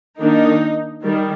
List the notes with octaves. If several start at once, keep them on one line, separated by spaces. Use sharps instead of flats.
D#3 A#3 D4 D#4
D#3 G3